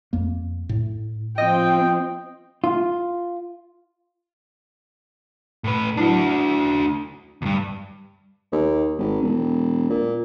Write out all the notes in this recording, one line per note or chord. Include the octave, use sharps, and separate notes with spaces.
F2 A#3
A2
F3 C4 D#5 G5
F4
A2 B4
F#3 D4 E4 F#4 A5
D2 G2
D#2
G#1
E1
A#2